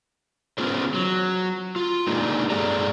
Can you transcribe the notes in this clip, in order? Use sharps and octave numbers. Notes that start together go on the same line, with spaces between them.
B3 C#4 F4 G#4 C5
F#3
F4
G#3 A#3 D4 D#4 G4 G#4
G2 G#3 G#4 A4 D5 A#5